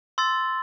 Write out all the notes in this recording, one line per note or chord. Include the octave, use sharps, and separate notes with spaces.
C6 E6 A6